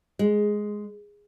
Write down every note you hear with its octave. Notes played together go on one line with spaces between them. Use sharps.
G#3